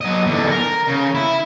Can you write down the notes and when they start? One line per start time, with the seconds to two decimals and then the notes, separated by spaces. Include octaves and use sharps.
0.01 F#3 D#5
0.26 E2 D3
0.50 A#4
0.87 C#3
1.15 E4